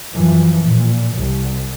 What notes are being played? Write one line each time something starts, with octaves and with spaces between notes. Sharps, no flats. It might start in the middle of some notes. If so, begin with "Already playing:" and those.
F#2 E3 F3
A#2
C2